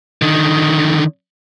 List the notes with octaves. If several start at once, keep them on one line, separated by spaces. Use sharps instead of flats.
D3 D#3